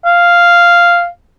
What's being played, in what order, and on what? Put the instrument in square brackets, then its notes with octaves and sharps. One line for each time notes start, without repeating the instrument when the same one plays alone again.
[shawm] F5